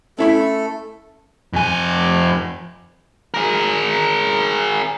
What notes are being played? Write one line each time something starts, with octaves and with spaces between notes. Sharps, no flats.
A3 C#4 E4 A4 B5
F2 G#5
G#4 A#4